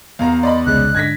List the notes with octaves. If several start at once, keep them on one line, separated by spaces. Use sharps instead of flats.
E2 F5 A#5
D5 D#5 B5 C6
C2 C#3 G#3 F#6
G#2 D3 G#6 A#6 B6